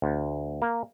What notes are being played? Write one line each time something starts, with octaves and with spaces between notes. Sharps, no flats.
D2
A#3